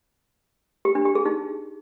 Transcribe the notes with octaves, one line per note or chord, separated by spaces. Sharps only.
G4
D4
G4
G#4
D#4